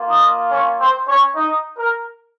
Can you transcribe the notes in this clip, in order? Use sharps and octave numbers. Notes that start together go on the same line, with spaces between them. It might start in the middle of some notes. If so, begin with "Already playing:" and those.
Already playing: A#3 F4
D#4 D#5
C#4 C#5
C4 C5
C#4 C#5
D#4 D#5
A#4